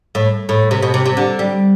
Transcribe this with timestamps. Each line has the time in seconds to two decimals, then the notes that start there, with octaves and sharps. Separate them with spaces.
0.15 A2
0.49 A2
0.71 C3
0.82 B2
0.94 C3
1.06 C3
1.17 D3
1.39 G3